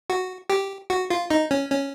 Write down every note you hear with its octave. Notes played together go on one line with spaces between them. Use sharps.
F#4
G4
F#4
F4
D#4
C#4
C#4